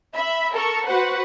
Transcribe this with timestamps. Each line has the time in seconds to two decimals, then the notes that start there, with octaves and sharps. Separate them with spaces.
0.15 E5 B5
0.54 A4 A#4 C#6
0.86 F#4 B4 C5 F#5